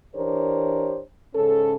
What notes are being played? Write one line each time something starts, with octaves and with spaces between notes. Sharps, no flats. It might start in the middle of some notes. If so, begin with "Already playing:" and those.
E3 D4 G4 A#4 C5 C#5
G#2 C#3 C#4 A4